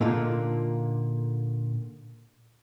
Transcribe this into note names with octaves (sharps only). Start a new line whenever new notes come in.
A#2 D3 A#3 D#4 F4